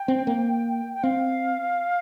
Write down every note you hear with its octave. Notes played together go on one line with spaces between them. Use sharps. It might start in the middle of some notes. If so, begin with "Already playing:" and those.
Already playing: G5
C4
A#3
G5
C4 F5